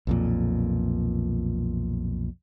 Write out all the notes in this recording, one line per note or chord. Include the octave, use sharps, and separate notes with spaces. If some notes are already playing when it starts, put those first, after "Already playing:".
B1 F2 A#2